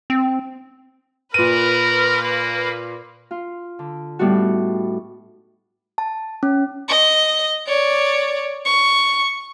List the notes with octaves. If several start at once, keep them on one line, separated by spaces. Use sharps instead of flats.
C4
A#2 A#4 B4 D#7
A#3
F4
D3
A2 G3 B3 D#4 F#4
A5
C#4
D#5
C#5 D5
C#6